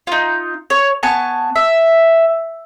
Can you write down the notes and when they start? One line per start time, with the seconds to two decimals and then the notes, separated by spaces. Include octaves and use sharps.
0.07 D#4 F4
0.70 C#5
1.03 B3 G#5 A5 C#6
1.56 E5